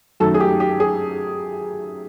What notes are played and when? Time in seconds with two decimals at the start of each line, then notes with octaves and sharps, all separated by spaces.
0.20 F#2 D#3 F#3 A3 A4
0.34 G#4
0.40 G4
0.60 G4
0.80 G#4